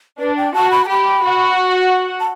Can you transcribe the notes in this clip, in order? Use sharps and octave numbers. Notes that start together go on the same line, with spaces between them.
D4 B4
G5
F#4 A5
B5
A5
G4 B5
F#4 F#5
A5